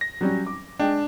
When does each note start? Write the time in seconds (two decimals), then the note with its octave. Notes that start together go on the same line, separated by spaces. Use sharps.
0.01 A#6
0.21 F#3 G3 C#4
0.46 D6
0.79 G#3 D4 D#5 G5